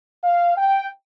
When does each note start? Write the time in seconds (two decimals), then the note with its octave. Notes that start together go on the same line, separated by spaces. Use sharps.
0.24 F5
0.58 G5